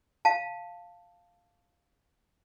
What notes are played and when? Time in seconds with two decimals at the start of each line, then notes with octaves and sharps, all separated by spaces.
0.25 F5 A5